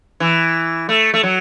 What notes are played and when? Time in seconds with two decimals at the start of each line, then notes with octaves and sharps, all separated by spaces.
0.20 E3
0.89 A3
1.14 A3
1.23 F#3